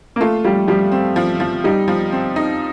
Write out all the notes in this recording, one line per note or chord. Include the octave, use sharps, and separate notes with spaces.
A#3
A3 F4
G3 F4
F3 G3
C4
F3
F3
G3 D#4
F3
C4
D#4